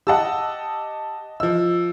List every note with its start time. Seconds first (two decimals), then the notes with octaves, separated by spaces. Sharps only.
0.07 G4 D#5 F#5 A5 E6
1.40 F3 D#5 E6